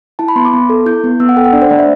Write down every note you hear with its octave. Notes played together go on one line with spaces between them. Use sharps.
E4 A5
B5
B3 C6
D6
B3
A4
E4 G6
B3
B3 E6
F#5
A4 G5
F#5
D4 D5
C5
A3 D5
E5